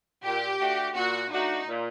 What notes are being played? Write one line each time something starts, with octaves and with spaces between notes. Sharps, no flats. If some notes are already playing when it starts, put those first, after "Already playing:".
A#2 G4
A3 D4 F#4
A#2 F#4
A3 D4 D#4 F#4
A#2